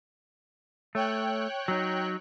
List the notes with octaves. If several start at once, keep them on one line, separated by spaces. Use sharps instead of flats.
A3 C#5 G5 F#6
F#3 D#4